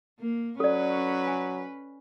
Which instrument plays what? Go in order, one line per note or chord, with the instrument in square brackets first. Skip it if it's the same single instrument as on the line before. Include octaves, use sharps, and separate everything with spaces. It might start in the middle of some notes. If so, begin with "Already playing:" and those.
[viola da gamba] A#3
[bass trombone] F#3 [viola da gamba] C#4 B4 [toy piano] A4 D5
[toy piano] G#5